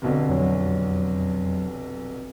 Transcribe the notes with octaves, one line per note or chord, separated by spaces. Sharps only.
F1 B1 D3
F2 F#3